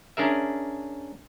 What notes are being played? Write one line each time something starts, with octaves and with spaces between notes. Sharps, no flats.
C#4 D4 G#4 A#4 E5